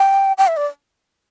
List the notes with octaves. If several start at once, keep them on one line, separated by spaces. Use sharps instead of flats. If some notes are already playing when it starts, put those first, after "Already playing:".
Already playing: G5
G5
E5
D5